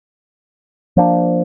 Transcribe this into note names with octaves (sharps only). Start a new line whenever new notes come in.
F3 A#3 D4